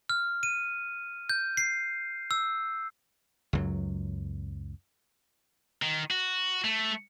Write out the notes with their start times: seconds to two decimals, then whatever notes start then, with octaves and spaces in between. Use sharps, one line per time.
0.10 F6
0.43 D#7
1.29 G6
1.57 C7
2.31 E6
3.53 C#2 F#2 F#3
5.82 D#3
6.11 F#4
6.64 A3